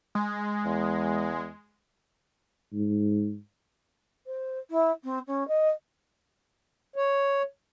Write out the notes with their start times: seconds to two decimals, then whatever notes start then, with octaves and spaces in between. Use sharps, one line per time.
0.15 G#3
0.65 E2
2.73 G#2
4.26 C5
4.70 E4
5.04 C4
5.27 C#4
5.48 D#5
6.96 C#5